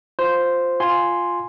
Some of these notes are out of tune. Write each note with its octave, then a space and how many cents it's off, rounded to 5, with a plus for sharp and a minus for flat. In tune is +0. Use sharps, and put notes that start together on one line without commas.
F4 +10 C5 -5
F4 +0 G#5 +0 C6 +0